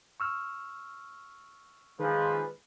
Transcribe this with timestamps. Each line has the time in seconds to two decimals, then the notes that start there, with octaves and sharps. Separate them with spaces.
0.20 C#6 E6 F6
2.00 A#2 D#3 F3 G#3 G#4 B4